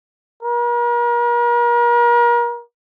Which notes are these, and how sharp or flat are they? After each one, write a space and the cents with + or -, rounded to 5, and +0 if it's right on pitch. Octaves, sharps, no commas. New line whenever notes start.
A#4 +40